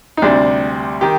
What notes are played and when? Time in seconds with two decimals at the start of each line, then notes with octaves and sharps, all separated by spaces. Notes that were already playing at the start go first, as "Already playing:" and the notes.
0.17 D#4
0.22 D2 C3 G3 D4
1.01 D#3 G4